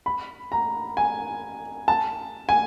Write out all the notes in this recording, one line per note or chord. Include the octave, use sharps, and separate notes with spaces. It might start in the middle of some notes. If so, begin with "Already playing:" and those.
B5
A#5
G#5
A5
G#5